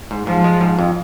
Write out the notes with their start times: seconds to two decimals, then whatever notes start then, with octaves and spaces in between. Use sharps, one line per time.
0.11 G#2
0.27 G#2 F3
0.44 G#3
0.61 G#2
0.79 F2